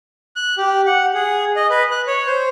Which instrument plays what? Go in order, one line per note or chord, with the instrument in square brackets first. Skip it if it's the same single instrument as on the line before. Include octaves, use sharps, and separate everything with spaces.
[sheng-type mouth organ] F#6
G4
F#5
G#4
D#5
B4
F#6
C#5
C5